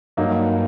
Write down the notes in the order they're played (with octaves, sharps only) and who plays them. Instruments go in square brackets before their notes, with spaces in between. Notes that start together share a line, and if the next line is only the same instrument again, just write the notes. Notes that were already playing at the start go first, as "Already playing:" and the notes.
[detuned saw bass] G2 [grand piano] F#3 A#3 D#4